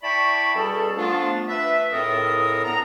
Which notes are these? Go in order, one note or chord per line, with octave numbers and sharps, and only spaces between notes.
E4 D5 G5 A5 B5 C#6
B2 G3 C#4 G#4 A4
F3 A3 B3 D4 F4
B4 E5
C#2 A2 C4 A4 A#4 D#6
E2 B3 D4 A#5